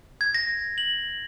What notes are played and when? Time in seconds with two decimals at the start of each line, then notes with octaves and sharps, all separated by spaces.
0.21 G#6
0.34 A#6
0.78 F#7